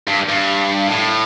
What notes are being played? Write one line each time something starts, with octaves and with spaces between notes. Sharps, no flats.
G2
G2
A2